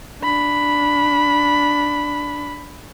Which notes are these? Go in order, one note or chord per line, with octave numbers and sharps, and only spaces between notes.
D4 B5